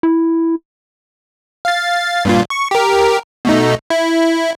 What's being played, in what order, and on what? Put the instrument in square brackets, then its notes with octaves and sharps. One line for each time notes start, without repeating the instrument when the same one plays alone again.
[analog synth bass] E4
[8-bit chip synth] F5 A6
G2 A#2 F4
C#6
G4 A#4
B2 A3 D#4
E4